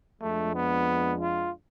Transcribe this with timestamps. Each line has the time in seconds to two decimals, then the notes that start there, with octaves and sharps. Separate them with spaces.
0.22 F2 F3 G#3 A3 D4
0.54 B3
1.21 F4